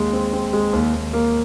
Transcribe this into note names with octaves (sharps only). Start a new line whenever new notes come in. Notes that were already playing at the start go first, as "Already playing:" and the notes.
Already playing: D#2 G#3
C4
C4
G#3
D#2
D#2
A#3